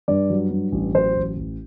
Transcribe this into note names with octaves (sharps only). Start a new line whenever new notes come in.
G2 D5
F#3
G2
A1
F#3 C5
A1
A1